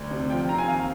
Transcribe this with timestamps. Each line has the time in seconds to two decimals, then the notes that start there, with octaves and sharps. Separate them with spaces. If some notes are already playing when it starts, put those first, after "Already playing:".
Already playing: D2
0.11 C3
0.30 F3 G5
0.49 C4 A#5
0.58 G#5
0.68 D#2 F5